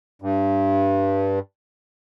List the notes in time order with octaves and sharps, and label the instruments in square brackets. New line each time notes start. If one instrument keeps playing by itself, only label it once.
[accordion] G2